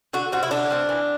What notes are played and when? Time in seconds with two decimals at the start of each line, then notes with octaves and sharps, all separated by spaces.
0.13 D3 F#4
0.32 G3 C4 F#4
0.43 E4
0.51 D3 D4
0.70 G3 C4
0.89 E3